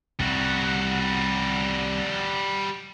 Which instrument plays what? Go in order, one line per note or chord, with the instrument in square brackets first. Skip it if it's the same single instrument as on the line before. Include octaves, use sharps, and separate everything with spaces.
[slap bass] C2 [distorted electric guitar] G3 F#4